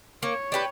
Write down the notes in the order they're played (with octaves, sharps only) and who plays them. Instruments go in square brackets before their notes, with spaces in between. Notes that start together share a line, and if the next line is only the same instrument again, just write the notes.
[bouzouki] A#3 [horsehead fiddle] C#5
[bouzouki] D4 G4 B4